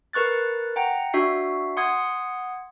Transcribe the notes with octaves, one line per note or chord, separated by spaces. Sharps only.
A#4 B4 C#6 F#6 A6
F#5 G5 A#5
D4 F#4 E5 C7
F#5 C6 D#6 G#6